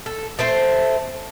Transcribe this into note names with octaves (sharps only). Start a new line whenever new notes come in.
A4
A3 C4 C5